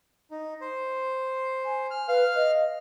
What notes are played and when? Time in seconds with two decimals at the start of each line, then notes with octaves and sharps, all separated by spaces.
0.31 D#4
0.61 C5
1.65 G#5
1.90 F6
2.08 B4 F5 F6
2.35 D#5